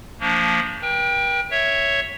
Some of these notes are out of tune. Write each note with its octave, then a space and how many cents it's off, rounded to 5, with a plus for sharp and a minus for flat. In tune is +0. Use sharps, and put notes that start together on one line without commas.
F3 +0 A#3 -25 D4 -25
B4 -45 G5 +15
C#5 +0 E5 +0